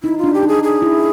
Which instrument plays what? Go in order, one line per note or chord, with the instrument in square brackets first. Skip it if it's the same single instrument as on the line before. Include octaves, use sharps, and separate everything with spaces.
[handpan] D#4 [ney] E4
[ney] F4
[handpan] D4
[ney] G4
[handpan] D#4 [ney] G#4
[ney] G#4
[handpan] E4